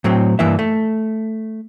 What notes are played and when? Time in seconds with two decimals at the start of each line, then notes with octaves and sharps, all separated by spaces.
0.04 A2 F#3 C4
0.39 G2 E3 A#3 E4 E5
0.59 A3